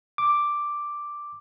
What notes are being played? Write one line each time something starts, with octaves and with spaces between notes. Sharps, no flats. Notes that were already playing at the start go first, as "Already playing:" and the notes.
D6